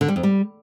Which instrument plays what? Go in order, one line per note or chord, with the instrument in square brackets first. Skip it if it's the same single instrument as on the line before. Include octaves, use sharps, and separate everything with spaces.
[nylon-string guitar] D3
G3
F2
G3